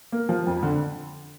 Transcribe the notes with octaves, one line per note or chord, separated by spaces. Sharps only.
A#3
F3
F2
D3